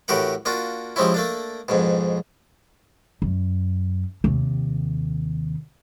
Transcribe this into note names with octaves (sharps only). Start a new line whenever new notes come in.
A2 E3 F#4 G4 A#4 F#5
A#3 D4 F4 F#4
C3 F3 G#3 C4 C#4 E4
A3 A#3 D4
F2 G#2 B2
F#2
D#2 C3